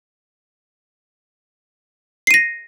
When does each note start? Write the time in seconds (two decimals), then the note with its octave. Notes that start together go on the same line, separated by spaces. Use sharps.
2.27 C7
2.31 D#7
2.34 A#6